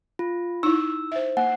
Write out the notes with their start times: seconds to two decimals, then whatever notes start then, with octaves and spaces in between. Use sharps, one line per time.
0.19 F4
0.63 D#4 E4 E6
1.12 C5 E5
1.37 A#3 F#5